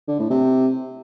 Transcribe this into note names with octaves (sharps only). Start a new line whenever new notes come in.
D3
A2
C3